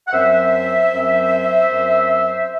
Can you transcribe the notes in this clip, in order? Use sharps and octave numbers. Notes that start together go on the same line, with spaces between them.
F#5
F#2 F#3 C4 C5 E5
F#2 F#3 C4
F#2 F#3 C4